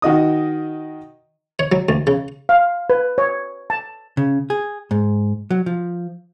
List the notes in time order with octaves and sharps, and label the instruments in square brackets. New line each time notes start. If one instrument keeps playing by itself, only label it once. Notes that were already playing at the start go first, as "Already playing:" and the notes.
[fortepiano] D#3 F#4 D#5 D#6
[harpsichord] C#5
F#3
D2
C#3
[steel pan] F5
B4
C#5
A5
[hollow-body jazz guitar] C#3
G#4
G#2
F#3
F3